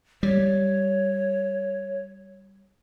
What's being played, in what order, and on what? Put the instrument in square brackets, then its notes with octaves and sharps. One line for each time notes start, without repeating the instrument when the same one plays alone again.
[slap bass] G3 [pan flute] C#5